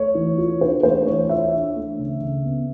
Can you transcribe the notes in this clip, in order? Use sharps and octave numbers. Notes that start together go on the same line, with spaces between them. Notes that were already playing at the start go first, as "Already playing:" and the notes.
Already playing: A3 C#5
E3
F4
D4 C5
A3 C5
E3 C#5
F4 E5
D4
A3
C#3
C#3
B3